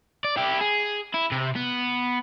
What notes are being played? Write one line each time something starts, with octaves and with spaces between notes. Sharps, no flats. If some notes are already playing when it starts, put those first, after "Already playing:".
D5
E4 G4
G#4
E4
C3
B3